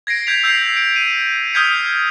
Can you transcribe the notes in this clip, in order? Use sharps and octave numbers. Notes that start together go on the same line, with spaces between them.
G#6 A#6 C7 D7
G6 G#6 B6 F7
E6 G6 G#6 B6 C7
D7
D#7
D#6 F6 G6 G#6 B6 C#7